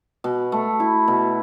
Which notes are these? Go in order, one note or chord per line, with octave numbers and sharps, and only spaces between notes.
B2
A3
E4
B2